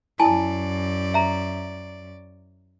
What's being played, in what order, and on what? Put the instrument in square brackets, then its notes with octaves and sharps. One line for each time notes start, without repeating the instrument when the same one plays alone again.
[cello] F#2 D5 [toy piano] E4 G#5 A5
[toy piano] E5 A#5